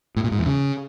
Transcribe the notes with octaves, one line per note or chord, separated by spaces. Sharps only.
A2
A#2
G#2
E2
C#3